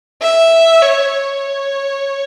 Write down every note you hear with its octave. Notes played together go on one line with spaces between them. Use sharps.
E5
C#5
C#5